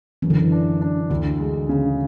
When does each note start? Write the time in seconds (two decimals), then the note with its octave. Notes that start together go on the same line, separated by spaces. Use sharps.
0.22 F#2 E3
0.30 D3
0.39 E3
0.52 D4
0.81 D4
1.10 D2 D3
1.40 G#3
1.69 C#3